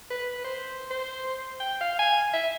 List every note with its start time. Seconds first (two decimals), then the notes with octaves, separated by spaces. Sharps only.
0.10 B4
0.44 C5
0.91 C5
1.60 G5
1.81 F5
1.99 G#5
2.33 E5